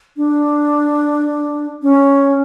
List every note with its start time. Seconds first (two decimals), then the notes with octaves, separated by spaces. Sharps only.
0.17 D4
1.82 C#4